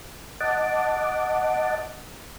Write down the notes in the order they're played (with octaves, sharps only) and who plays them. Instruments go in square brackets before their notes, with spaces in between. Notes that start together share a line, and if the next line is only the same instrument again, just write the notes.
[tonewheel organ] D#5 F#5 A5 D6